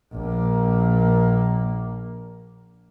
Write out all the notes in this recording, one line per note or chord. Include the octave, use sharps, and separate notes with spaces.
A#1 A#3